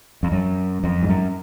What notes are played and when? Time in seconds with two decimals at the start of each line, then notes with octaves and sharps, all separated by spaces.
0.23 F2
0.32 F#2
0.84 F2
1.03 G#2
1.09 F#2